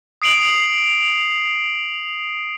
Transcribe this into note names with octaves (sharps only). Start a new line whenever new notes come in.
D#6 C7 D7 F7 F#7